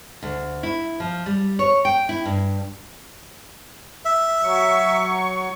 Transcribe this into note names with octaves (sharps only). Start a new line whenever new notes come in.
D2
E4
F3
G3
C#5
G5
E4
G2
E5
F#3 C#6